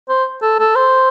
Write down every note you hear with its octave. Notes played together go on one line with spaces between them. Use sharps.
C5
A4
A4
C5